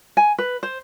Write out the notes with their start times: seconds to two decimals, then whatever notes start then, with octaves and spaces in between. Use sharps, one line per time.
0.17 G#5
0.38 B4
0.63 C5